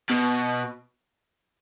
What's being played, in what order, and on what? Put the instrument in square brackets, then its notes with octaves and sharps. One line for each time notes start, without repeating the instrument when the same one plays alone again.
[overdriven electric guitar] B2